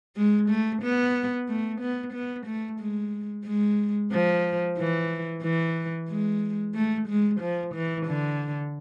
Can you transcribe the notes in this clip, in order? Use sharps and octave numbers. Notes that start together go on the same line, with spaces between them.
G#3
A3
B3
A3
B3
B3
A3
G#3
G#3
F3
E3
E3
G#3
A3
G#3
F3
E3
D3